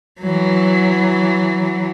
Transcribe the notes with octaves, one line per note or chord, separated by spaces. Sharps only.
E3 F#3